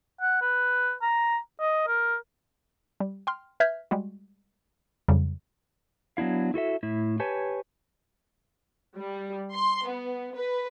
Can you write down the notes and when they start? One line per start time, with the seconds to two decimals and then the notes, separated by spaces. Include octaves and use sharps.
0.21 F#5
0.42 B4
1.02 A#5
1.60 D#5
1.87 A#4
3.00 G3
3.27 G5 C6 F6
3.60 B4 E5 F6 G6 G#6 B6
3.91 G3 G#3 F#4
5.08 F2 C#3 F#3 G3
6.17 F#3 B3 D4 E4 F5
6.54 E4 F#4 A4 E5
6.83 A2 E4
7.20 G4 B4 C#5 G#5 A5
8.96 G3
9.54 C6
9.88 B3
10.35 B4